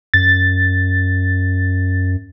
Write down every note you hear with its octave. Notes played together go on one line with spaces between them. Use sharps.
F#2 A6